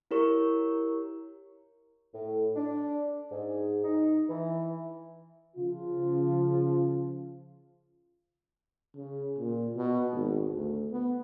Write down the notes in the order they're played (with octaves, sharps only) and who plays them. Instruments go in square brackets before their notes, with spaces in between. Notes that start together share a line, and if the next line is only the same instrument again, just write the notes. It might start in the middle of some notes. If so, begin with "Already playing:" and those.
[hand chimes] E4 G4 A#4 C#5 C#6
[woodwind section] A2
D4
G#2
D#4
E3
[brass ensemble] C#3 F3 F4
[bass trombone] C#3
A#2
B2
G#1
D2
B3